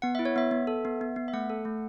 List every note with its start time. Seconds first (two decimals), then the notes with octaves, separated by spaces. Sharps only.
0.02 B3 F#5
0.15 E4 E5
0.25 C#5
0.36 B3 E5
0.51 B3
0.67 A4
0.85 B3
1.01 B3
1.16 B3
1.28 E5
1.33 A3 F#5
1.50 A4
1.65 A3